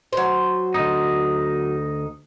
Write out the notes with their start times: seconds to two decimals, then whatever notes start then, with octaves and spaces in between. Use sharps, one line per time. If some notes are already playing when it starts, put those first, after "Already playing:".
0.13 F#3 C5
0.74 D2 D#4